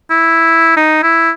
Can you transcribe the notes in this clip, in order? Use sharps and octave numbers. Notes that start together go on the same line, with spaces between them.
E4
D#4
E4